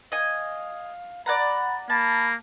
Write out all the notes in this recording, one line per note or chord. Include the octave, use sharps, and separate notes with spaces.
D#5 F5 G#5
D5 F#5 A#5 B5
A#3 A5 B5